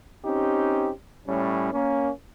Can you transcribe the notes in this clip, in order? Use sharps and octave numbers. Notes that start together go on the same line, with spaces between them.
C4 C#4 D#4 G4
A2 G3 C#4
A#3 C#4